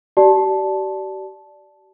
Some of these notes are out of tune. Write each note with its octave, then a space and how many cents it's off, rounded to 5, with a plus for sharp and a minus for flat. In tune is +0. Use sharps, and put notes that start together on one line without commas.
G4 -40 D5 +0 A5 -10